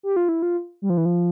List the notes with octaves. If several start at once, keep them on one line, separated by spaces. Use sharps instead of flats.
G4
F4
E4
F4
G3
F3
E3
F3